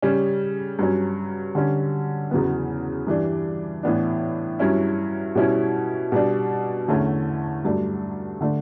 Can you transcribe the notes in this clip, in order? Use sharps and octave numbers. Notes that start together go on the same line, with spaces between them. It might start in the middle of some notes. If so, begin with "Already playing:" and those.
C#3 G3 C#4
G2 F#3 C#4
D3 G3 C#4
E2 C#3 F#3 B3
G2 E3 G3 D4
A2 E3 B3 D4
G2 F#3 C#4 E4
B2 G3 C#4 E4
B2 G3 D4
E2 D3 A3 C#4
G2 F#3 A3 D4
D3 A3 D4